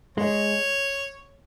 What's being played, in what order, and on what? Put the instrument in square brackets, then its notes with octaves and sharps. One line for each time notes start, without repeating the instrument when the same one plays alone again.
[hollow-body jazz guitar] G#3 [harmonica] C#5